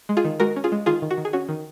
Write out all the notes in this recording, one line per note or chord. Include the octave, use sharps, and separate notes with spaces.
G#3
F4 G#4
D#3
G#3 F#4 A#4
C#4
F4 G#4
G#3
D#3 F4 G#4
D#3
F#4
D#3
G#4
C#4 F#4
D#3